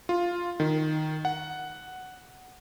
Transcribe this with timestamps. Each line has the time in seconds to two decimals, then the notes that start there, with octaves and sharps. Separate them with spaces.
0.09 F4
0.60 D#3
1.25 F#5